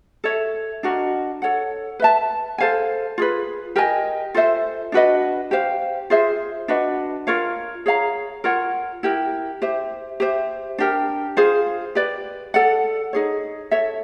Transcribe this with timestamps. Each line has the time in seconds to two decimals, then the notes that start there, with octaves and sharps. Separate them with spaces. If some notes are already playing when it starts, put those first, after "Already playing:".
0.24 A4 C#5 E5
0.83 D4 F#4 A#4 D#5
1.42 A4 C#5 F#5
2.00 B4 E5 A5
2.58 A4 C5 F5 G#5
3.18 F4 G#4 B4
3.76 G4 A#4 D#5 G#5
4.34 F4 A4 C5 E5
4.92 D4 F#4 B4 D#5
5.51 G4 C5 F5
6.10 F4 G#4 C5 E5
6.68 D4 F#4 B4 D#5
7.27 F4 A#4 C#5 F5
7.86 G#4 C#5 F5 A#5
8.44 F4 A#4 C#5 F#5
9.03 E4 G4 A#4
9.62 G4 C5 E5
10.20 G4 C5 E5
10.78 D4 G4 A#4
11.37 F4 G#4 C5 F5
11.95 G4 B4 D5
12.54 A4 D5 F#5
13.13 D#4 G#4 C#5
13.71 A4 C#5 E5